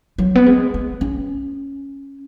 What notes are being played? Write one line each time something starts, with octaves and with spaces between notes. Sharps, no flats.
F#3
B3
G#3
B3
C#4